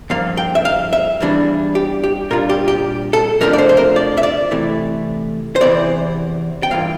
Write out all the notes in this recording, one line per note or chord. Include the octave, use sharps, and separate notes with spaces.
G2 F3 A#3 F5
G5
E5
F5
E5
E2 E3 G3 D4
G4
G4
A#2 G3 D4 F4 A#4
G4
G4
A4
F2 C3 F3 A3 D4 A#4
D5
C5
C5
A#4
D5
E5
D5
C3 E3 A3 E4
C5
E2 C3 E3 D5
G5
G2 E3 A#3 F4 F5